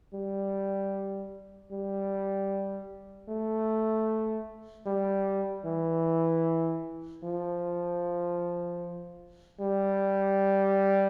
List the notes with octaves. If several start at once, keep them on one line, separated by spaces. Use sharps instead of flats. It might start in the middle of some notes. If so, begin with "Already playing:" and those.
G3
G3
A3
G3
E3
F3
G3